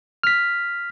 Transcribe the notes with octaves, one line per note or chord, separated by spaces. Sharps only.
F6 B6